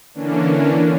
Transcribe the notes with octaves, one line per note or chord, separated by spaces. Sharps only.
D3 E3 A#3 C#4 D4